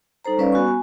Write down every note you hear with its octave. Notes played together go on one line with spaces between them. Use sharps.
G3 D#4 A4 C5 A#5
G3 C#4 B4 C#5 D5 F5
B3 F#4 G#5 C#6
G#5